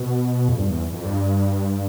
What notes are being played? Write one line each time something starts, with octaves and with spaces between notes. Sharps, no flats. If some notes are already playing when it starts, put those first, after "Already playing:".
Already playing: B2
F2
G2
E2
F2
G2